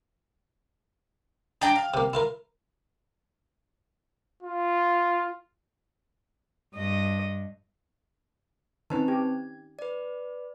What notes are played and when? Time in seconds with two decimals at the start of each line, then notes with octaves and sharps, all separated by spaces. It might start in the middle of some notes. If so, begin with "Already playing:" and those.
1.62 D4 D#4 G5 A#5
1.76 F5
1.94 C3 A#3
2.13 E4 F4 A#4
4.43 F4
6.75 G2 D#5
8.90 D#3 C4 C#4 B4 A5
9.08 G4 G#6
9.79 B4 D5